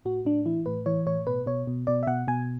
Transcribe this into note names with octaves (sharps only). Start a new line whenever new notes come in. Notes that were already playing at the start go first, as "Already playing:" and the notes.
A2 F#4
A2 D4
E3 E4
A2 B4
E3 C#5
A2 C#5
B2 B4
B2 C#5
B2
B2 D5
E5
B2 F#5
B2 G#5